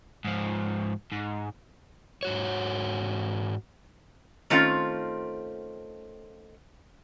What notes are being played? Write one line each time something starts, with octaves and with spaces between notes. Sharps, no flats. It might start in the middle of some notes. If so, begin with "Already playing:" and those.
G#2 F3
G#2
G#2 F#4 C#5
D#3 A3 C4 C#4 F4